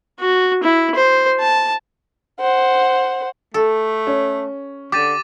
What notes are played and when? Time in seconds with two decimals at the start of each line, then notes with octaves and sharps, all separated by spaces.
0.20 F#4
0.63 E4
0.95 C5
1.40 A5
2.40 C5 F#5
3.54 A3 A4
4.07 C#4
4.92 D3 G4 D6 A6 D#7